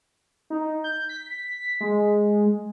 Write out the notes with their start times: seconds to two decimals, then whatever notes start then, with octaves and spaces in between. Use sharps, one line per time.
0.50 D#4
0.84 G6
1.09 B6
1.81 G#3